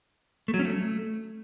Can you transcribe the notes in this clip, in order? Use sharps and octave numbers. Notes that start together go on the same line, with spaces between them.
A3
F#3
C#4
A3